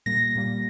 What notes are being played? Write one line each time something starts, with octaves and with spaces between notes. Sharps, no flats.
A#2 G3 A#3 A#6
A#2 G3 A#3